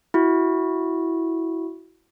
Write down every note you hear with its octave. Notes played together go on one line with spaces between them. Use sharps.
E4 F#4